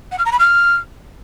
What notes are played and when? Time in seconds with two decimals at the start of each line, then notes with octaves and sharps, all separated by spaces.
0.11 F#5
0.18 F6
0.25 A#5
0.32 B5
0.39 F6